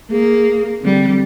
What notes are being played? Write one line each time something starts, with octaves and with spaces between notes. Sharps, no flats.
A#3 G#4
D3 G3 C4